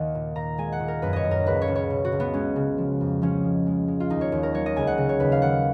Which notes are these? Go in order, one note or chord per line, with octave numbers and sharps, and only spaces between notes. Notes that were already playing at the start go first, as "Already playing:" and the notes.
Already playing: D#2 D#3 D#5 F#5
A#2
A#2 A#5
G#3 G#5
F#5
A#2
A#4
F#2 B4
C#5 D#5
F#2
A#4
C#2 B4
C#5
C#2
C#5
B2
F#4
C#2
B3
G#3 C#4
C#3
F3
F2
F3 C#4
G#3
G#3
G#3
F4
D#2 D#4
C#5
D#2
A#4
F#3 C#5
D#5
C#2 G#5
F#5
C#3
C#5
D#2 B4
F5
D#3 F#5